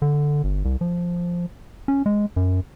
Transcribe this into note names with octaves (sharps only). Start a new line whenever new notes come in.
D3
G1
C2
F3
C#4
G#3
F#2